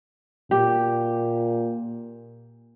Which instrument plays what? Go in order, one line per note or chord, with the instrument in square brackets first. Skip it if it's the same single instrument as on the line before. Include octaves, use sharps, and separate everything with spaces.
[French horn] A#2 [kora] G4